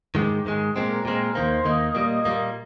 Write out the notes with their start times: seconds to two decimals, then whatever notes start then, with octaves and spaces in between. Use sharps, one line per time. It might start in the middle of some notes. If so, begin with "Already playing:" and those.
0.15 G#2 D#3 G#3 G4
0.45 G#2 D#3 G#3 G#4
0.76 A#2 G#3 C4 A#4
1.05 A#2 G#3 C4 A#4
1.35 D#2 D#3 A#3 C5
1.65 D#2 D#3 A#3 D#5
1.95 A#2 G3 A#3
2.25 A#2 G3 A#3